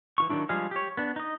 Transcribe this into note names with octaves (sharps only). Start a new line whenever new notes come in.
E3 F4 C#6
D#3 F#3 G3 D4 E4
F3 G3 G#3 G#4 F5
G4 C#5
B3 D4
D#4 D#5